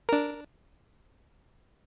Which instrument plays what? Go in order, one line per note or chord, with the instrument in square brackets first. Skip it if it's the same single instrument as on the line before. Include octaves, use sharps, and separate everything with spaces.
[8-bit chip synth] D4 A#4